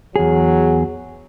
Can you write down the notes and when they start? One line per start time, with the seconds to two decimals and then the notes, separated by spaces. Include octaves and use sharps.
0.16 E2 F#3 G#4